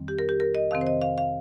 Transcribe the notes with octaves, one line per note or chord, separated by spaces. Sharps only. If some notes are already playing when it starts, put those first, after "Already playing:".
Already playing: F2 D#3 G3 C4
G4
A#4
G4
A#4
D#5
F2 C3 D#3 C4 F5
C5
D#5
F5
F5